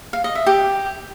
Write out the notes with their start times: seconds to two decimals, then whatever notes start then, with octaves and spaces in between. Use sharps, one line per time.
0.13 F5
0.24 D#5
0.35 E5
0.46 G4